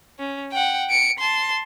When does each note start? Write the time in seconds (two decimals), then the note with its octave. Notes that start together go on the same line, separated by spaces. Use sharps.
0.19 C#4
0.52 F#5 G5
0.90 C#7 D7
1.19 A5 C6